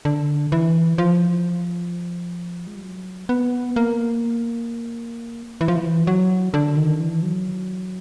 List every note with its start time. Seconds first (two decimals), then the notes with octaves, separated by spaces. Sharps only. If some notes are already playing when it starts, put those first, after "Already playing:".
0.05 D3
0.52 E3
0.98 F3
2.67 G#3
2.75 G3
2.84 F#3
3.29 B3
3.76 A#3
5.61 E3
5.68 F3
5.76 E3
6.07 F#3
6.54 D3
6.77 D#3
7.00 E3
7.23 F#3